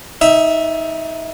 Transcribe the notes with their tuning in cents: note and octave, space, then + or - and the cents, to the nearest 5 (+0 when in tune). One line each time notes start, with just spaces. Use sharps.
D#4 +20 E5 +0